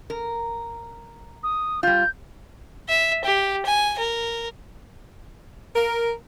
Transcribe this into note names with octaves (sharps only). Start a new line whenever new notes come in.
A#4
D#6
G3 F4 G6
E5
G4
G#5
A#4
A#4